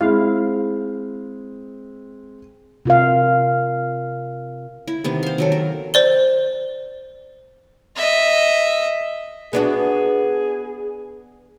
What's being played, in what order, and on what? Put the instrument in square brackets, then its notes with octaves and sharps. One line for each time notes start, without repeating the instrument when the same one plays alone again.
[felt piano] G#3 C4 [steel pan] E4 F5
[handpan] C3 F4 A#4 F5
[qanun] E4
C3 D#3 B3
C5 F5
D#3 F#3 A4
A#4
[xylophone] C5 D5 G7
[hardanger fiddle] D#5 E5
[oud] B3 D4 F#4 [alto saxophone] G#4